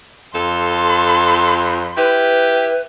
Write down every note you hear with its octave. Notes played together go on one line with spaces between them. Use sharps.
F2 A4 C6
E4 G4 B4